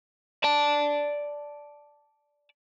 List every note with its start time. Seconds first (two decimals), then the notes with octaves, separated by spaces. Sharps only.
0.44 D5 A5